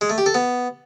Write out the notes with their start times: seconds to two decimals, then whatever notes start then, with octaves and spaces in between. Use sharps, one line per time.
0.01 G#3
0.10 A3
0.18 G4
0.26 A4
0.34 B3